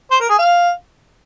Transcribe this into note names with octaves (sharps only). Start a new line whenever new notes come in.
C5
A#4
G#4
F5